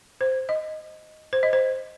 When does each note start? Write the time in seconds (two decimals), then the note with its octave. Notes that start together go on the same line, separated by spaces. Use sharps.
0.21 C5
0.49 D#5
1.33 C5
1.43 D#5
1.53 C5